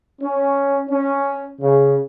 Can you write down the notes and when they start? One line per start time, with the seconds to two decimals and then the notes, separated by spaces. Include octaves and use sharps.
0.21 C#4
0.89 C#4
1.61 C#3